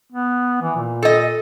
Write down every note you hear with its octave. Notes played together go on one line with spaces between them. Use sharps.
B3
E3
A#2
A4 D#5